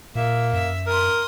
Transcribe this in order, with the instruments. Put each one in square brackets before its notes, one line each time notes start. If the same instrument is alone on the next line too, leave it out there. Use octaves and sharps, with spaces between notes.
[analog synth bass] A#2 [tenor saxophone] A#3 [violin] E5
[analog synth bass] F#2 [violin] E5
[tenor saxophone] A#4 [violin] C6 D#6